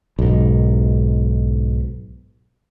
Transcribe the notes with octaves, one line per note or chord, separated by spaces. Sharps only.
B1 G#2